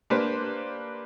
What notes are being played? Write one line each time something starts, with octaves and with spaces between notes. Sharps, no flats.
A#3 D4 G4 B4 C5